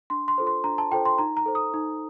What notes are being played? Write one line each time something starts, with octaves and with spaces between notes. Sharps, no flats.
D4 C6
C6
F4 A4 C5
C6
D4 A#5
A5
F4 A4 C5 G5
C6
D#4 A#5
A#5
A4 C5
D#6
D#4